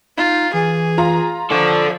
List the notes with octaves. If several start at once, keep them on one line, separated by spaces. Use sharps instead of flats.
D#4 F4
E3 G#4
F4 A#5
F3 A4 D5 C#6